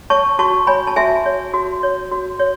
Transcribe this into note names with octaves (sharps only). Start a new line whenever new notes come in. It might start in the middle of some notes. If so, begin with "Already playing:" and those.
C#5 A5 C#6
F#4 A5 C#6
C#5 G#5 B5
A5
F#4 E5 G#5
C#5
F#4
C#5
F#4
C#5